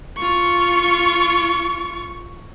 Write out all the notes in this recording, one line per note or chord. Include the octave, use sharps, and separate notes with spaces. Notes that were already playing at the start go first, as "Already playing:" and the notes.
F4 C#6